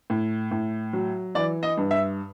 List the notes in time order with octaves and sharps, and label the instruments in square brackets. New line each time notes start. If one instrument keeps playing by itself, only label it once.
[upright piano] A2
A2
F#3
E3 D5
D#5
G2
E5